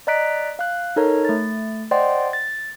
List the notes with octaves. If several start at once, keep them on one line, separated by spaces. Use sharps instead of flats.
D5 D#5 A#5 F#6 B6 D7
F5 F#6
D#4 A4 A#4 C#5 A#5
A3 A6
C5 D5 D#5 F#5 G5 C6
A6